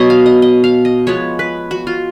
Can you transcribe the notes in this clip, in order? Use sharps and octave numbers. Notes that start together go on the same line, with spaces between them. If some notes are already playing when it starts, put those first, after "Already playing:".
Already playing: B2 F#3 B3 C#5 D#5
F5
D#5
D#5
F5
D#5
F3 G#3 B3 C#5
B4
F#4
F4